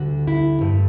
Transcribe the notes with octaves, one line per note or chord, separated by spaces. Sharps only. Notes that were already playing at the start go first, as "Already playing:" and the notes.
Already playing: D2 D3 G3 F#4
E4
G2 D3 A3